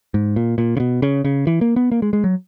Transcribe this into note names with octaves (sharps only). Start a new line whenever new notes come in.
G#2
A#2
A#2
C#3
B2
C#3
C#3
E3
A#3
B3
A#3
G#3
G#3
F#3